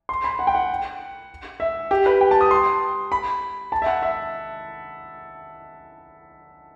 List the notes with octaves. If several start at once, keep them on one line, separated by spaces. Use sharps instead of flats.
C6
B5
F#5
G5
F#5
E5
G4
B4
G5
A5
D#6
C6
B5
A5
E5
F#5
E5